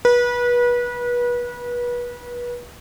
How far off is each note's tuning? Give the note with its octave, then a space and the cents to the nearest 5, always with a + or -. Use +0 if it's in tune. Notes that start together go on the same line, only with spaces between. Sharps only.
B4 -30